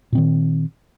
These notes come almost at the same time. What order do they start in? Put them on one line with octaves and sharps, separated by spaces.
A#2 C4 D#3